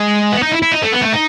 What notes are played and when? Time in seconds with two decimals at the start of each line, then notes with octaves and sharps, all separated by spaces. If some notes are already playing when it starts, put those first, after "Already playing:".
Already playing: G#3
0.32 B3
0.42 D#4
0.52 E4
0.62 E4
0.72 D#4
0.82 A3
0.93 B3
1.02 A3
1.13 D#4